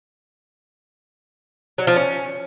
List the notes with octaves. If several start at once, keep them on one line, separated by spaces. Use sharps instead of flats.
F#3
F3
C#4